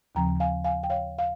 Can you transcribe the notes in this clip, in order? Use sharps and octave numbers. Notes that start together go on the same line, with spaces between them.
D#2 C#3 F3 C4 G5 A#5
F5 G#5
F5 G#5
G5
C#5 F5
F5